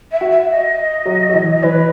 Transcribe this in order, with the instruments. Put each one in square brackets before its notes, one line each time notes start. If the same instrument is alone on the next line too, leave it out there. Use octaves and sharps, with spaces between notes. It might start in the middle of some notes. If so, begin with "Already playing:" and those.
[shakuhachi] E5
[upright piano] F#4
[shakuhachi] E5
D#5
[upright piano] F#3
F#3
E3
[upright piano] E3 [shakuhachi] B4